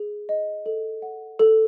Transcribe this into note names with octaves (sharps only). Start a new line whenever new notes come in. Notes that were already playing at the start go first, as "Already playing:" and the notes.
Already playing: G#4
D#5
A4
F#5
A4